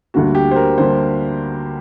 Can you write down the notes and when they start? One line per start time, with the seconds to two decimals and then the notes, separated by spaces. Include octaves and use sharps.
0.14 D2 D3 G3 A#3 F#4
0.35 G4
0.51 C5
0.56 A#4
0.78 D3 G3 A#3 C5